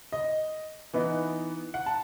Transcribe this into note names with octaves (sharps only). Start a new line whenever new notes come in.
D#5
E3 B3 D#4
F#5
A5